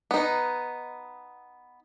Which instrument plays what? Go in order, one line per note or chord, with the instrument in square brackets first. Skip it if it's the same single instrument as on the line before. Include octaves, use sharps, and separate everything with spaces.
[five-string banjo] B3 D#4